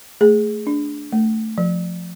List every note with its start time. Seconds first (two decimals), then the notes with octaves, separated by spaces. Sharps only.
0.21 A3 G#4
0.67 D4
1.13 A3
1.58 F3